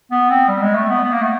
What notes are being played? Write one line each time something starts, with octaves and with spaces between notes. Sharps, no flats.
B3
C4
G3
G#3
A3
B3
B3
A#3
A3